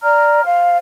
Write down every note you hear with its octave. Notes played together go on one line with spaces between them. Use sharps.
D5 A#5 F6
C5 F5